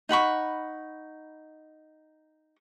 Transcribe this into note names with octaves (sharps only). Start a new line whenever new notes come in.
D#4 F#5 B5 C#6